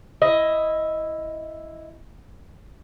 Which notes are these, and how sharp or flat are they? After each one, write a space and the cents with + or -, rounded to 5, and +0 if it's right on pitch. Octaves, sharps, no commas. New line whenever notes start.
E4 +0 D#5 +10